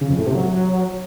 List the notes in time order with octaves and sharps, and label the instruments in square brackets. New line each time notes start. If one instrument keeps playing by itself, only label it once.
[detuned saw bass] C#3
F2
A2
C3
F#3